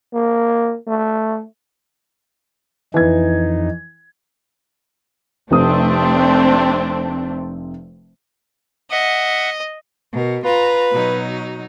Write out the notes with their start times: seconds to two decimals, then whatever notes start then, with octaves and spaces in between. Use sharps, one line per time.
0.14 A#3
0.87 A3
2.94 F2 E3 D#4 G#6
5.51 F1 C3 A3 C4 D4 D#6
8.91 D#5 E5 F#5
10.12 B2 A#4
10.44 F4 B4 A#5
10.91 B2 F#3 D#4